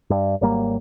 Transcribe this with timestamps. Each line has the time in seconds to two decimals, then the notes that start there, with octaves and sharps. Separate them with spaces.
0.10 G2
0.41 G#1 F#3 G3 A#3